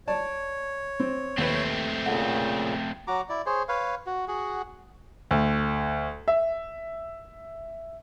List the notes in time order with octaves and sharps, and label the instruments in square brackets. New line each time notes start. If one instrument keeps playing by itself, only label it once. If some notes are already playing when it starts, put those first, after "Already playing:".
[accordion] C#5 [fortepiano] D5 A5
[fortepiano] C4
[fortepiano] D#2 B4 [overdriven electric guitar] A3 C4
[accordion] A#2 C#3 [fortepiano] A4 F#5
[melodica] F#3 F#4 A#5 D6
E4 D5
G#4 C5 C#5
B4 C#5 F5
F#4
F#4 G#4 F#5
[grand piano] D2
E5